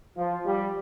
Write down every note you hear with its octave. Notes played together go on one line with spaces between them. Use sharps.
F3
G3